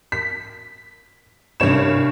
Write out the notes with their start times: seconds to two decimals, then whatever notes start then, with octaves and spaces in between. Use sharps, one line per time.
0.12 B6
1.60 C2 G2 C#4 C#5 E7